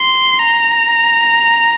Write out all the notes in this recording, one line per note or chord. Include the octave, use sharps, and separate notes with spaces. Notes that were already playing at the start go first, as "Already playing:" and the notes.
Already playing: C6
A#5